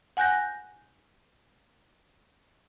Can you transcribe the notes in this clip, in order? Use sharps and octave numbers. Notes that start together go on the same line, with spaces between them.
F#5 G#5 F#6 G6 A#6